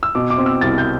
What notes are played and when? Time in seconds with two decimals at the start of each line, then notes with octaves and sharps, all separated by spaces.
0.03 E6
0.15 B2 D6
0.30 D6
0.38 C4
0.46 E6
0.61 C2 A6
0.78 G6